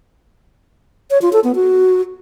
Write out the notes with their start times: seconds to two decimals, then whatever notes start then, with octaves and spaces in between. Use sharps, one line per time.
1.11 C#5
1.22 F4
1.33 A4
1.44 B3
1.55 F#4